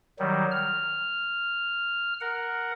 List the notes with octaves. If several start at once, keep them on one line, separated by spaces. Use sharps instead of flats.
D#3 F#3 G3
F6
A#4 F#5